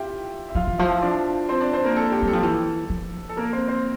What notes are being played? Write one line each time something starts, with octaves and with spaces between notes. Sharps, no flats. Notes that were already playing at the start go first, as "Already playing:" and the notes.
Already playing: E4 F4 G4 E5 F5 G5
E5
F3 F4 F5
E3
F3 E4 E5
D4 D5
C4 C5
D4 D5
C4 C5
A#3 A#4
A4
G4
G3
A4
F3 G4
E3 A4
F3
A4
A#3 A#4
C4 C5
C4 C5